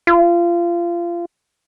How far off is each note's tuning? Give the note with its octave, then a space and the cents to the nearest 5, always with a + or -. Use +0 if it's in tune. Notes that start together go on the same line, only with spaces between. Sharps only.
F4 -25